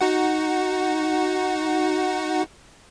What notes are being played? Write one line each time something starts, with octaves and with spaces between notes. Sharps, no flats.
D#4 F#4 F#5